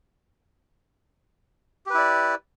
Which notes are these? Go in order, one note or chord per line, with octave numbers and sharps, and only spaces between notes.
E4 G4 B4 D5